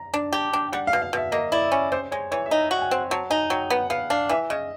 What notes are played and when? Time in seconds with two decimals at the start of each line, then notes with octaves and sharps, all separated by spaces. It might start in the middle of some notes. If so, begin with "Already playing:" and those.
Already playing: A#5
0.14 D4 A5
0.33 G4 A5
0.53 D4 G5
0.73 G3 F#5
0.87 F5
0.93 B2
1.02 F5
1.13 B2 E5
1.32 A#3 D#5
1.52 E4 D5
1.72 C#4
1.92 C3 C5
2.12 G#3 C#5
2.31 E3 C#5
2.46 E5
2.51 D#4 D#5
2.71 F#4
2.77 G5
2.81 G#5
2.91 C4
3.10 F#3 A5
3.30 D#4 G#5
3.50 F#3 G5
3.70 B3 F#5
3.90 B3 F5
4.10 D4 F5
4.29 E3 E5
4.50 C#3 D#5